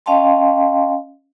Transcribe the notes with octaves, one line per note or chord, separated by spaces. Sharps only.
C#4 D#5 F5 G5 A5 C6